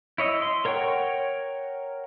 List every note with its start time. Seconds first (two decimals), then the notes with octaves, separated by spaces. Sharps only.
0.18 E4 C#5 D#5 E6
0.42 C6
0.65 A#4 C#5 F#5 G5 C#6